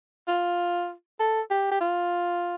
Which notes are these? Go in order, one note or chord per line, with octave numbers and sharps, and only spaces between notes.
F4
A4
G4
G4
F4